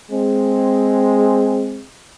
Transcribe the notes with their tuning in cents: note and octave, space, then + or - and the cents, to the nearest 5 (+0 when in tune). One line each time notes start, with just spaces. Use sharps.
G#3 +0 C4 +0